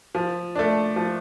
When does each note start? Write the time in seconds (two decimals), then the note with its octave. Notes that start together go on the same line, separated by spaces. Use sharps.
0.15 F3
0.56 A3 D4
0.96 F3